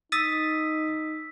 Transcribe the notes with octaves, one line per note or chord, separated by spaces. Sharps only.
D#4 D#6 E6 A6 B6